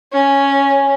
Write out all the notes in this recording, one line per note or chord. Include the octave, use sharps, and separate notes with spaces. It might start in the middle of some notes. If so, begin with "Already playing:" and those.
C#4